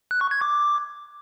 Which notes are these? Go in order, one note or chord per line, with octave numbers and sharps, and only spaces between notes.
F#6
C#6
G#6
D6